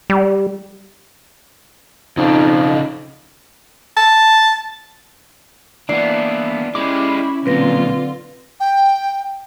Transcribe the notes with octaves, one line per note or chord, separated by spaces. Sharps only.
G3
F2 C#3 D4 D#4
A5
E3 A#3 B3 D4 E4 D5 C7
G#3 C#4 E4 G4 D6
B1 A#2 D3 C4 F4 B4 A#6
G5